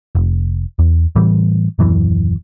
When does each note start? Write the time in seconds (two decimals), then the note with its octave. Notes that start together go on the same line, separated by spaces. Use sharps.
0.15 F1
0.79 E2
1.16 A2 E3 G3
1.79 D#1 F#2 E3